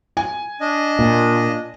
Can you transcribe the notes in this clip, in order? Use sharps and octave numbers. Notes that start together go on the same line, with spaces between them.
G#5
D4 D#5
A#2